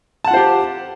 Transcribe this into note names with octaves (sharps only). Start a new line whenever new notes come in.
F4 G4 C5 F#5 A5